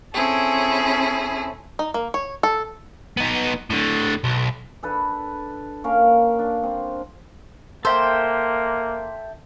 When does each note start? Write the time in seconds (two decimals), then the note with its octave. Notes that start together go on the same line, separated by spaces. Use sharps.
0.15 C4 C#4 E4 G#4 A4
1.79 D#4
1.94 A#3
2.14 C#5
2.43 A4
3.17 B3 D#4
3.70 A2 D3
4.24 B1
4.83 D4 A4 B4
5.84 A#3 C#4 A#4 F5
6.39 D4
6.63 C4
7.85 A#3 A4 C5 E5 G5